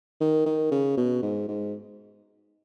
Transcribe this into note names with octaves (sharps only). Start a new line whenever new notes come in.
D#3
D#3
C#3
B2
G#2
G#2